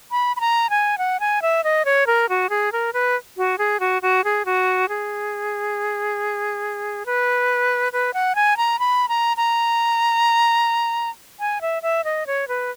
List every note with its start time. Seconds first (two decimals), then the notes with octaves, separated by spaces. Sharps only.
0.11 B5
0.36 B5
0.41 A#5
0.70 G#5
0.98 F#5
1.20 G#5
1.42 E5
1.64 D#5
1.85 C#5
2.07 A#4
2.29 F#4
2.50 G#4
2.72 A#4
2.93 B4
3.37 F#4
3.58 G#4
3.80 F#4
4.02 F#4
4.24 G#4
4.45 F#4
4.89 G#4
7.06 B4
7.93 B4
8.14 F#5
8.35 G#5
8.57 A#5
8.79 B5
9.09 A#5
9.37 A#5
11.40 G#5
11.61 E5
11.83 E5
12.04 D#5
12.27 C#5
12.48 B4